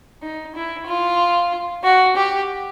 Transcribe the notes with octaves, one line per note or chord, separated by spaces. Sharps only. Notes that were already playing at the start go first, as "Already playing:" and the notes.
D#4
E4
F4
F#4
G4